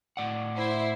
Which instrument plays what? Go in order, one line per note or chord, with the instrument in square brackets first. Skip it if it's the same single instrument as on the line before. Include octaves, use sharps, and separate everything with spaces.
[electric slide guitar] A2 D5 F#5
[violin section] E4 C5